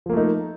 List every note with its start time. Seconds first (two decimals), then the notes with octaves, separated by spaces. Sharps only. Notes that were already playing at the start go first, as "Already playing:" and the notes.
0.06 F3
0.09 A#3
0.13 A3
0.17 D#4